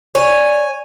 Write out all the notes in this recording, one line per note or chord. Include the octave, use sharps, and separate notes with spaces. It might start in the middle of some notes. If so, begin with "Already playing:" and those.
C#5 D5 G#5